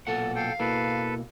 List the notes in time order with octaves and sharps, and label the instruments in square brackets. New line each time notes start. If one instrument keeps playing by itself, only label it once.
[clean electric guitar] B1 A#2 F#5 [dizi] A4
[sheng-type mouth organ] A4 G5 [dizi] F5
[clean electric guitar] B2 A#3 E4 [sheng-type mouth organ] A4 B4